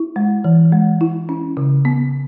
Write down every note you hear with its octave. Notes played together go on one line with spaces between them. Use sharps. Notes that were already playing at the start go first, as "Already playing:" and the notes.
Already playing: E4
G#3
E3
G#3
E4
C#4
C#3
B3